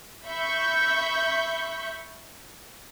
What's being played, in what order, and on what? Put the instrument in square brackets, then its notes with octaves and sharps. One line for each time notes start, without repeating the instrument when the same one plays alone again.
[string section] E5 B5 C#6 G6